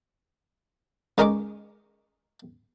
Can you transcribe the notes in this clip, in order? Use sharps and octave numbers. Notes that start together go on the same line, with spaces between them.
C#2 D#4 A#4 G#5 C#6 D6